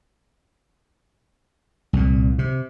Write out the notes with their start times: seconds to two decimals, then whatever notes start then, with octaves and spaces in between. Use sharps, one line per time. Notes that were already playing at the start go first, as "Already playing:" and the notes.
1.93 C2 A#2
2.39 C3